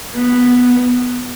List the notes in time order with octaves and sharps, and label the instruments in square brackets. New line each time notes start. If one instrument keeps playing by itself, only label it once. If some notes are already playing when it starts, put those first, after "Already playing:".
[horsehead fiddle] B3